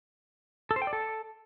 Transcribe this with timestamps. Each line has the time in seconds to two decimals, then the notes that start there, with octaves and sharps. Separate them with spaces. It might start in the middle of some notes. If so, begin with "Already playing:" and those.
0.71 A4
0.76 C5
0.82 G5
0.87 D5
0.93 A4